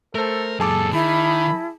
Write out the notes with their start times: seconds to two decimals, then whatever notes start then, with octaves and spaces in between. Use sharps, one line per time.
0.15 A3 A4 A#4 C5
0.60 F#2 A#2 G#4 A4 A5 D6
0.93 D#3 E4 B5